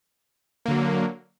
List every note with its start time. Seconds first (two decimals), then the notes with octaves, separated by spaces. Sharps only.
0.66 A#3
0.68 D3
0.71 F#3